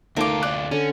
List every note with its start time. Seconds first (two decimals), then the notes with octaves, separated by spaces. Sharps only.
0.17 D2 D#3 A3 F4 A#4 A5 D6
0.43 D5 F#6
0.71 D3 C#4